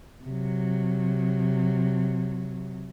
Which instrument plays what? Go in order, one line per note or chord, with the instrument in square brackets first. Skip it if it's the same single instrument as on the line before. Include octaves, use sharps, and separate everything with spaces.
[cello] C3 F#3